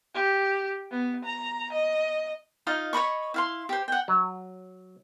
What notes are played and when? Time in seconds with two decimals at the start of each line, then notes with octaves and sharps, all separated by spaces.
0.15 G4
0.91 B3
1.25 A#5
1.73 D#5
2.67 D#4 F4 D#5 F5
2.93 C#5 D#5 B5 C#6
3.34 E4 F5 C6
3.69 G4 C5
3.88 F#5 G5
4.08 F#3